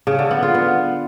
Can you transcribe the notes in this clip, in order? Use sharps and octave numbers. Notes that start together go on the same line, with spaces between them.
C#3
D3
B3
F4
B3